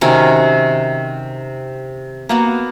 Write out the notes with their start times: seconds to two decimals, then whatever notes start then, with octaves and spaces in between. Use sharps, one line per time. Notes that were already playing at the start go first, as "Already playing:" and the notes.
0.01 C3 D#3 C#4 F#4
2.29 A#3 B3 F#4